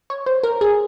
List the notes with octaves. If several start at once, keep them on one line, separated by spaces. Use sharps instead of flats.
C#5
C5
A#4
G#4